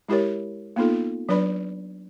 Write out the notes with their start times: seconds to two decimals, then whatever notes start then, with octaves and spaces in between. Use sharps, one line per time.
0.09 G#3 E4 G4 A#4 C#5
0.76 A#3 B3 D#4 F4 A4
1.29 F#3 D4 B4 D5 B5